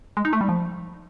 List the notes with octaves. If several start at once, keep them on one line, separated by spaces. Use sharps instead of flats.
G#3
D#4
A3
G3
F3